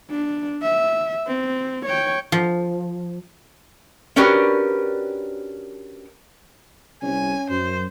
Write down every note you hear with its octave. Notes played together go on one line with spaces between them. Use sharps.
D4
E5
C4
C#5 G5
F3
C#4 D4 F#4 G4 A#4 B4
C2 C#4 G#5
F#2 C5